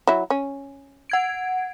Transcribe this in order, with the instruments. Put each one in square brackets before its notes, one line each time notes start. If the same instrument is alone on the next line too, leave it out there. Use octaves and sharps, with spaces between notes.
[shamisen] F#3 E4
C#4
[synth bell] F#5 G#6 D7